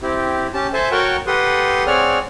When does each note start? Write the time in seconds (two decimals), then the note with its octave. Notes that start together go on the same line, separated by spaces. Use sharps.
0.01 C4 E4 G4
0.54 C#4 G4 A5
0.73 A4 C5 E5 G#5 A5
0.91 F#4 A#4 C#5 F#5 G5 A5
1.27 G4 A4 B4 F#5 C6 D#6
1.87 C4 G#4 C#5 D5 F#5 F6